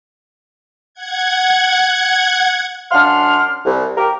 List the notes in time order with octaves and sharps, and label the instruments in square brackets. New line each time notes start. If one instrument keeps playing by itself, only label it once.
[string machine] F#5 G#6
[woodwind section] F#2 D4 F#5 C6 F6
C2
G4 A#4